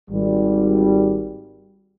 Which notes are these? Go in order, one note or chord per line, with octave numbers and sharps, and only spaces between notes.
G#1 G3